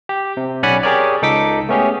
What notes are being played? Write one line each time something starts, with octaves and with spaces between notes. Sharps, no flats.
G4
C3
B1 C#4 D5 F#5 G#5 B5
G4 G#4 A#4 C#5 D5
C#2 D#4 A4 D6 B6
A3 B3 C#4 G4 G#4